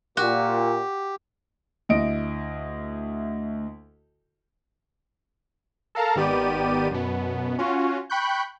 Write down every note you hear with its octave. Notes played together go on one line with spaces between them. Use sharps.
A#2 F#4 G4
D2 E4 D#5 D7
A4 A#4 F5 A5 A#5
G#1 D#3 B3 G4 D5 D#7
F#2 B2 B3
C#4 F4 F#4
G5 B5 C#6 F#6 G6